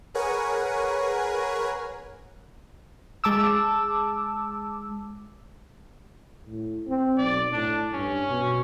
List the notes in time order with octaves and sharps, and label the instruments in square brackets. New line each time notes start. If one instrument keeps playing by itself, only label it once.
[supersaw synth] G#4 A#4 B4 C#5 F#5 G#5
[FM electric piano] G#3 A5 D6 E6
[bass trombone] A2
C4
[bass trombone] B1 [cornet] D5
[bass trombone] A2 [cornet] D4
[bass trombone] G2 [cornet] C#4
[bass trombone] B2